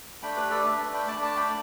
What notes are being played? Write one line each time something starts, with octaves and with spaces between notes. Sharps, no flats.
A3 D4 G5 B5
G4 B4
A4 D5
A3 D4 B4 E5
G5 B5
A3 D4 A5 D6
A5 D6
G5 B5